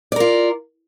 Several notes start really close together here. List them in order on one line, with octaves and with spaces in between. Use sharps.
D5 A#4 F4